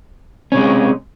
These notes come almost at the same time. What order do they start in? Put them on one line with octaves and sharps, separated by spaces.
C#4 C3 G#3